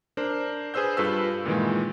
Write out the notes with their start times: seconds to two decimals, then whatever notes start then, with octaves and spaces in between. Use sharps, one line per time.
0.17 D4 A#4 C5
0.74 G#4 B4 C5 E6 G6
0.97 G2 F4 A4 B4 E6
1.45 A#2 D#3 E3 G#3